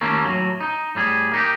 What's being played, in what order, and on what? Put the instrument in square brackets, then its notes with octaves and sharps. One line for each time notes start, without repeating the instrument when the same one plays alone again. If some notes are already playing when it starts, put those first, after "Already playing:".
[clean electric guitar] D#2 A3 A#3 C#4
A2 F#3
D#4
A2 G3 G#4
A#3 D#4 G4